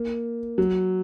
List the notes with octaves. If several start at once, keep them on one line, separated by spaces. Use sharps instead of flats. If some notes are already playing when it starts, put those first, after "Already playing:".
Already playing: A#3
F#3